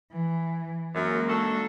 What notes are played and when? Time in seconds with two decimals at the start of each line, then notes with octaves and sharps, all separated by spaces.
0.12 E3
0.95 F#2 G#3 A#3
1.28 D4 F#4 A4